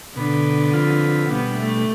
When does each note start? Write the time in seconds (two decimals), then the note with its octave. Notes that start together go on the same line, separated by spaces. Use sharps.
0.16 B2 D3 B3 D4
0.73 F3 C4 F4 B4
1.29 B2 G3 B3 D4
1.57 A3